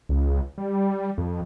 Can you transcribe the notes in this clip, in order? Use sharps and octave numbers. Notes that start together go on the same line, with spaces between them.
C#2
G3
F2